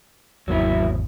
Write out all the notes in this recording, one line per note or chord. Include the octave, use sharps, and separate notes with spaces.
G#1 E2 F#3 A#3 E4